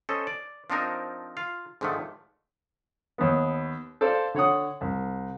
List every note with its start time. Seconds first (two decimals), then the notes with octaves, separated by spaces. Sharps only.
0.09 C#4 A4 C5 D#5
0.27 D5
0.70 F3 C4 D4 D#4 A#4
1.37 F4 F5
1.81 G#2 D3 D#3 F3 A3
3.18 D#2 B3
4.01 A4 C5 D5 F5
4.34 D3 C#5 F#5 D#6
4.81 C2